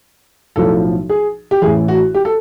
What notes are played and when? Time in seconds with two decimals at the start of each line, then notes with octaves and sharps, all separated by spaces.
0.56 B1 A2 F3 A4
1.09 G#4
1.51 G4
1.62 A1 A2 E3 G#4
1.88 F#4
2.14 G4
2.25 A4